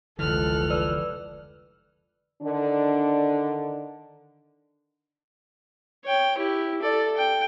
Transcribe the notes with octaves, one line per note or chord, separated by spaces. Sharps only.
F1 C#2 D3 E3 A4 F6 F#6
B4 D5 E6
D3 D#3 D4
C#5 G5
E4 G4
A4 D5
G5